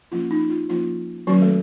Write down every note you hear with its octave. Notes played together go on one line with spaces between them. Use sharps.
F3 A#3 C#4 F4
D#4
F4
F3 A#3 C#4 F4
D#3 F#3 A#3 C#4 F#4
A3 A4